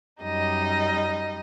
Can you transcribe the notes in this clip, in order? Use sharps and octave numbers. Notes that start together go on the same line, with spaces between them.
F#2 G3 D#4 D#5